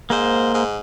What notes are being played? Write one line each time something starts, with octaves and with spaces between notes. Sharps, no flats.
G#2 A#3 C5
G#2